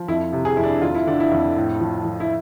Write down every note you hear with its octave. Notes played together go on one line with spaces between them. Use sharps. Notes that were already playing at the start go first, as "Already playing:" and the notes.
Already playing: F3
F2 E4
C3
G#4
F2 E4
D4
F2 F4
E4
D3 D4
E4
F2
A2
F3
F3
E4